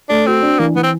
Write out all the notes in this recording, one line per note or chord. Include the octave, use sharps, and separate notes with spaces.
A3 D4
C4 F#4
D4
E3 A#3
E3 B3
C4